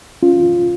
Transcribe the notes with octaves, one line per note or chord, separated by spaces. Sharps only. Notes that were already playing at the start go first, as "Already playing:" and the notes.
C#4 F4